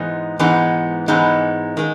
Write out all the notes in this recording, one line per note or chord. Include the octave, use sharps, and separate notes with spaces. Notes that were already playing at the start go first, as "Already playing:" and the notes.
Already playing: G#2 E3 G#3 B3 D#4
G#2 E3 G#3 B3 D#4
G#2 E3 G#3 B3 D#4
D#3 G#3